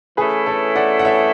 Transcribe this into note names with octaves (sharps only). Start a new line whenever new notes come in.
E3 A3 C#4 E4 G#4 B4
A4 C#5
D5 F#5
F#5
C#5 E5